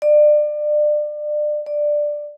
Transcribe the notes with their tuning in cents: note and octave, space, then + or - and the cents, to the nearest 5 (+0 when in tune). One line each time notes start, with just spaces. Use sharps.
D5 +30
D5 +10